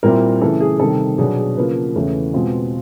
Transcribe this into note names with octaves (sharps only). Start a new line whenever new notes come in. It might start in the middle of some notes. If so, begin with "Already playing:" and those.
A#2 G3 C4 E4 A#4
C#3 E3 A3 A4
G#4
C3 D#3 G3 A4
B2 F#3 B3 D4 G#4
G#4
C#3 F3 A#3 B4
E2 C#3 E3 A3 C#4
B2 G#3 C4 F4